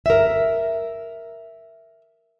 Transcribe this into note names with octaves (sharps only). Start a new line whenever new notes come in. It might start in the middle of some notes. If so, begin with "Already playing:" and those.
A#4 E5